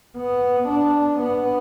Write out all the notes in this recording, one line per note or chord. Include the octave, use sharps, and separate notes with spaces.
B3
D4
B3